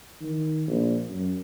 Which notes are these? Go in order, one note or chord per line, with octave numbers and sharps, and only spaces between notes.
D#3
A#1
F#2